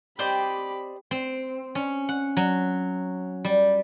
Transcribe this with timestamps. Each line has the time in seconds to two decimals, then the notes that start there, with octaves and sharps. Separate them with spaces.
0.19 C4 G4 C5 D5 D#5 B5
1.11 C4
1.75 C#4
2.09 F#5
2.37 F#3
3.45 G3